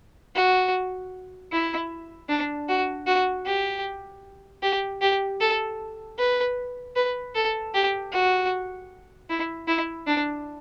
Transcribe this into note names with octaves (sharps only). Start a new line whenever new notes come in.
F#4
E4
D4
F#4
F#4
G4
G4
G4
A4
B4
B4
A4
G4
F#4
E4
E4
D4